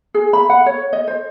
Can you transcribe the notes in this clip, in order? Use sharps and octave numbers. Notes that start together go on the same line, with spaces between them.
G#4
B5
F#5
C#5
D#5
C5